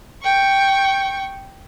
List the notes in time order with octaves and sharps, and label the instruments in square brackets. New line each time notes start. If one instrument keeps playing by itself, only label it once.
[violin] G5 C#6